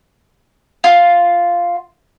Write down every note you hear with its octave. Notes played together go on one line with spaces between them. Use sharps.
F4